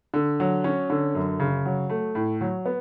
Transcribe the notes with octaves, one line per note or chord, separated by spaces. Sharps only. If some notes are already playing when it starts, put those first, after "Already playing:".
D3
F#3
C#4
D3
F#2
C#3
F#3
A3
A2
F#3
B3